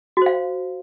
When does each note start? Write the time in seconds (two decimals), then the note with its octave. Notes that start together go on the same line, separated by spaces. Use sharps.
0.17 F#4
0.22 C5
0.26 F5